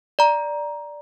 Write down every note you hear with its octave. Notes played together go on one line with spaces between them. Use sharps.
D5 A#5